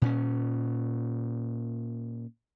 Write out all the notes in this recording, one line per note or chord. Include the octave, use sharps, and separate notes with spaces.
A#2 C#4